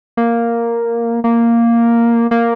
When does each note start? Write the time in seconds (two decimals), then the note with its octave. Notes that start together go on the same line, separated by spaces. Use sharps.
0.17 A#3
1.24 A#3
2.31 A#3